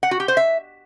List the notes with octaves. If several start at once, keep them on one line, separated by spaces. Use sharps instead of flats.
F#5
F#4
G4
C5
E5